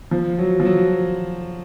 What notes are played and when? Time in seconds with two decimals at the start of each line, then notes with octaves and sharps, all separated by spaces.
0.11 F3
0.38 F#3
0.60 F3
0.65 F#3